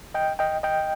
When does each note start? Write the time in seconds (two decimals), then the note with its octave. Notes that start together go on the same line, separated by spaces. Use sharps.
0.14 D#5 G5
0.39 D#5 G5
0.63 D#5 G5